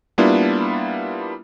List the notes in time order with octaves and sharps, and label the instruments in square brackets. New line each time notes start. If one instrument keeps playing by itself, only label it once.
[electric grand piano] G3 A#3 B3 D4 E4 F4